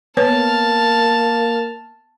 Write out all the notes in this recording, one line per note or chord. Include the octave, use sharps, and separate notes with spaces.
A#3 B3 B4 C#5 A5 F6